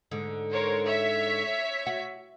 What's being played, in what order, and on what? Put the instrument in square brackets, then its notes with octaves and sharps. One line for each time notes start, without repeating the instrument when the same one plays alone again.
[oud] G#2 D3
[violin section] A#4 C5 C#5
C#5 E5 B6
[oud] F#4